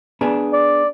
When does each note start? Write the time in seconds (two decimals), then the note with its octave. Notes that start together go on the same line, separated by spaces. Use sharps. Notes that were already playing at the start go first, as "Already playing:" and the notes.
0.21 B3 D4 G#4
0.53 D5